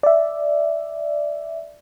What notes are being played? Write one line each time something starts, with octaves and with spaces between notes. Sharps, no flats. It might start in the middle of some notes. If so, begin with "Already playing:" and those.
D5 E5